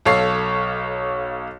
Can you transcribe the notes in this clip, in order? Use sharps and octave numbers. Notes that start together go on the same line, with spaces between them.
B1 A4 C#5 F5 C7